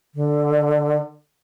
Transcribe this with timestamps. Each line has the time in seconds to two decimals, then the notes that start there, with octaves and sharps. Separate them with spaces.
0.15 D3